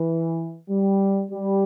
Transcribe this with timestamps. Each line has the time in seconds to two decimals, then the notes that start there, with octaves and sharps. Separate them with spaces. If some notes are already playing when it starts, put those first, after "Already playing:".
Already playing: E3
0.69 G3
1.31 G3